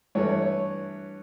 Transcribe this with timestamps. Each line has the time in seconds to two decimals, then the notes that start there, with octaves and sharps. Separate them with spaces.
0.15 G2 E3 A3 C#5
0.28 C#5
0.42 C#5